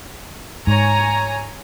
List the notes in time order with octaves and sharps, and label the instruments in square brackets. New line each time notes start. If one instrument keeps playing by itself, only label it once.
[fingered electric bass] G#2 [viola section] C#5 G#5 A#5